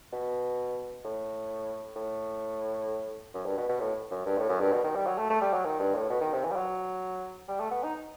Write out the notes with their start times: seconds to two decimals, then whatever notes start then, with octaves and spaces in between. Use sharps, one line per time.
0.13 B2
1.05 A2
1.96 A2
3.34 F#2
3.46 G2
3.57 B2
3.69 B2
3.80 A2
4.11 F#2
4.26 G2
4.38 A2
4.49 F#2
4.60 G2
4.72 B2
4.84 D#3
4.95 G3
5.07 F#3
5.18 A3
5.30 A3
5.41 G3
5.53 F#3
5.65 D#3
5.80 G2
5.95 A2
6.10 B2
6.21 D#3
6.33 C3
6.44 E3
6.51 G3
6.56 F#3
7.48 G3
7.60 A3
7.71 B3
7.83 D#4